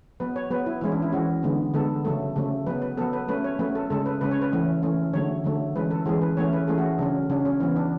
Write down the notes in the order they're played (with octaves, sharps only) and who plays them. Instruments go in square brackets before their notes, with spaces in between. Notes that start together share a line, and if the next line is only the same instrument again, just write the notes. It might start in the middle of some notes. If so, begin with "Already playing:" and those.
[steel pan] F#3 B3 B4
C#5
F#3 B3 B4
E4
E3 G#3 C#4 E4
D4
E4
E3 G#3 C#4 F#4
D3 G#3 B3
D3 G#3 B3 A4
C#3 F#3 A3 A4
C#3 F#3 A3
F#3 B3 B4
B4
F#3 B3 A4
B4
F#3 A3 C#4 B4
C#5
F#3 A3 C#4 B4
A4
C#3 G#3 C#4 A4
B4
C#3 G#3 C#4 B4
C#5
B4
E3 A3 C#4
E3 A3 C#4
D3 F#3 A3 C#5
D3 F#3 A3
E3 G#3 C#4 B4
A4
E3 G#3 C#4 G#4
B4
E3 A3 C#4 C#5
B4
E3 A3 C#4 G#4
F#4
C#3 F#3 C#4 D4
C#3 F#3 C#4 D4
C#4
E3 B3 C#4
D4